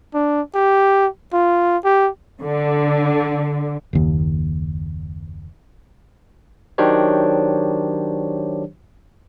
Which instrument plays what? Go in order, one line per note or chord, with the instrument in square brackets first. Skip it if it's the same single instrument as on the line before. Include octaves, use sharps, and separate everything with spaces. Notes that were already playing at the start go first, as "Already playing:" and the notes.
[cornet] D4
G4
F4
G4
[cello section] D3
[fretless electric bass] F#1 D#2
[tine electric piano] D#3 F#3 D4 G4 C5 C#5